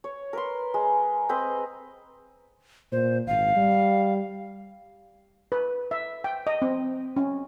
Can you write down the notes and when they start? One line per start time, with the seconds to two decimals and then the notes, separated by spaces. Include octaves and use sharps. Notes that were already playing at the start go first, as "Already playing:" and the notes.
0.04 C#5
0.33 A#4 B4 C6
0.74 G#3
1.29 C4 B4 D#5 A#5
2.92 A#2 C5
3.27 G#1 F5
3.56 G3
5.52 B4
5.91 E5
6.24 G5
6.47 D#5
6.62 C4
7.16 C#4